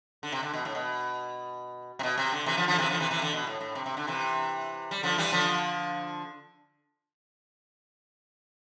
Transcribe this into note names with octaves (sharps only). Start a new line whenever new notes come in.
D3
C3
D3
B2
A2
B2
C3
B2
C3
D3
C3 E3
D3 F3
D3 F3
C3 E3
D3 F3
C3 E3
C3 E3
D3
B2
A2
A2
C3
C3
D3
C3 E3
G3
D3 F3
E3 G3
D3 F3